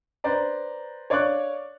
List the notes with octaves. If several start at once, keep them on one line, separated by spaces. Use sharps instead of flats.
B4 C5 D5 A#5
C#5 D5 F5 C#6 D6 F#6